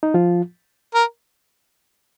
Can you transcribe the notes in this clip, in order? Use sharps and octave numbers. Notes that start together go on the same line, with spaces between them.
D#4
F3 F4
A#4